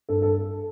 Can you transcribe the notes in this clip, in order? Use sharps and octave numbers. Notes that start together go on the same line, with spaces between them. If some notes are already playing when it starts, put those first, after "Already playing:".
G2 A4
A4